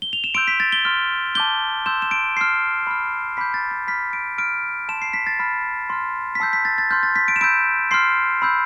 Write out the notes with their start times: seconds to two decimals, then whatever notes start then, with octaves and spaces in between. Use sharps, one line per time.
0.02 G7
0.13 F7
0.24 E7
0.35 C6 E6 G6 D7
0.48 B6
0.60 A6
0.72 G7
0.85 C6 F6
1.35 A5 D6 G6 G7
1.86 C6 E6 G6 E7
2.02 E7
2.11 D7
2.37 C6 F6 C7
2.87 B5 F6
3.37 B5 D6 G6 B6
3.54 A6
3.71 A6
3.88 B5 F6 B6
4.13 D7
4.38 C6 F6 D7
4.89 A5 C6 F6 E7
5.02 C7
5.13 B6
5.27 A6
5.39 B5 F6
5.90 C6 F6
6.35 B6
6.40 A5 E6 G6 C7
6.53 B6
6.65 A6
6.78 A6
6.90 C6 F6 G6
7.03 A6
7.16 B6
7.28 D7
7.36 E7
7.41 B5 E6 G6 D7
7.91 C6 F6 C7
8.42 B5 E6 G6